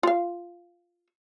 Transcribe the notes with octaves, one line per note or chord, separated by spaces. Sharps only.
F4 F5